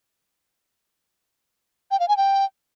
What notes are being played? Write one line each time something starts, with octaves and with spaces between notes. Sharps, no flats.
G5
F5
G#5
G5